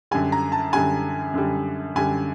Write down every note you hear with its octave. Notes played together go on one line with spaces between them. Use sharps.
F#2 D3 G3 G#5
A#5
A5
F#2 D3 G3 G#5
F#2 D3 G3
F#2 D3 G3 G#5